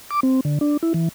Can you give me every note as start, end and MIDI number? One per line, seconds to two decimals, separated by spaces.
0.11 0.20 86
0.23 0.40 60
0.45 0.58 50
0.61 0.77 62
0.83 0.93 64
0.94 1.09 52